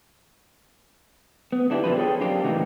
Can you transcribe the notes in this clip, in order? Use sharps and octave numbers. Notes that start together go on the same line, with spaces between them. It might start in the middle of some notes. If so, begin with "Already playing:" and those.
B3
D3 D4 E4 F#4 G4
B2 D3 F3 G3 B4
G#4 A4 C#5 G5
F#2 A#3 C4 D4 G4
A2 C#3 E3 D#4 F#4